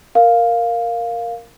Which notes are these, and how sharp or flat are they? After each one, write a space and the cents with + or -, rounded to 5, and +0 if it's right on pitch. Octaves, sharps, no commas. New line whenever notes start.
A#4 -5 F5 +0